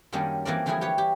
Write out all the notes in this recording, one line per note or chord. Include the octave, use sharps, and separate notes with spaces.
F#2 D#3 G3 A#3 C#4 D4
E3 F3 A#3 C4 A#4 D5
D3 E3 F3 G3 E4 G#4
G4 B4 C#5
G4